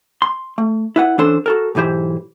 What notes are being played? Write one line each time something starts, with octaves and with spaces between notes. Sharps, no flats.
C6
A3
E4 B4 F#5
E3 C#4 D4 A4 C5 C6
F#4 A4 A#4
B1 G#2 E3 G4 C5